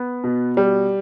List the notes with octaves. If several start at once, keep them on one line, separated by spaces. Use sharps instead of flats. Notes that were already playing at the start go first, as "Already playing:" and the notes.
Already playing: B3
B2
G3